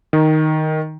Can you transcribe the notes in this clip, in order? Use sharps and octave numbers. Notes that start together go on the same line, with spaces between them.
D#3